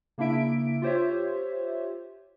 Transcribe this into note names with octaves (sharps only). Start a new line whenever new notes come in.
C#3 A#3 D4 E4 E5 D7
F4 G4 C5 C#5 E5